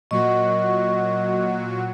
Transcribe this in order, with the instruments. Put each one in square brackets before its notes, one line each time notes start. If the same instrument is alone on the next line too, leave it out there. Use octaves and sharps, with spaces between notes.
[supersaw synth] A#2 F#3 F#4 [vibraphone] D#5 C#6